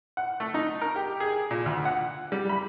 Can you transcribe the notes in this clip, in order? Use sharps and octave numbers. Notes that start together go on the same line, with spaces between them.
F#5
A3
D#4
A#4
G4
G#4
A#2
D2
F#5
G3
B5